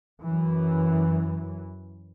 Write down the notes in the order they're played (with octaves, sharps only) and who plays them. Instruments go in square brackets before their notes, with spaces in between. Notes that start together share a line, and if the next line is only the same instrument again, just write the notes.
[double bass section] F#2 E3